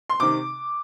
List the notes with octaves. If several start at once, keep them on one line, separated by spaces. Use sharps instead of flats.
C6
C3 D#3 D6